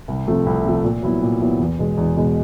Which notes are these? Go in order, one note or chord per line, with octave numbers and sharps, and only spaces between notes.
C2
C3 F3 A3
C2
C3 F3 A3
A#2
F#3 B3 E4
A#2
F#3 B3 E4
E2
B2 G#3
E2
B2 G#3